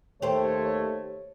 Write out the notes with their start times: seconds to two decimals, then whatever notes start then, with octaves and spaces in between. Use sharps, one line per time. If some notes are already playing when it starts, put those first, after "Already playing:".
0.22 D#2 A3 G4 C5 C#5